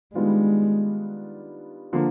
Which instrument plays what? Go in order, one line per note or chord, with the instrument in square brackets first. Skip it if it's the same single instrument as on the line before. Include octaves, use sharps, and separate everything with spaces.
[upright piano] D#3 G3 B3 D4 F4 [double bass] G#3
[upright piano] D3 F3 A#3